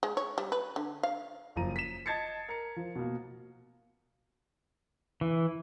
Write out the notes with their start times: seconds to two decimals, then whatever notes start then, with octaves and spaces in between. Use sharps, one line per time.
0.03 G#3
0.17 C#5
0.38 G3
0.52 B4
0.76 D3
1.03 F5
1.56 F#1 F3 A#5 D#7
1.76 B6 E7
2.06 D#5 A5 G#6 A6 C7 C#7
2.49 A#4 C#7
2.76 F3
2.95 B2 A#3
5.21 E3